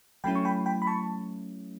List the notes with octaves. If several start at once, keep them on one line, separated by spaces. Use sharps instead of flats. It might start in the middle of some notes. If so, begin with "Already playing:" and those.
F#3 A3 C#4 E4 G5 B5
C#6
G5 B5
G5 B5
B5
A5 C#6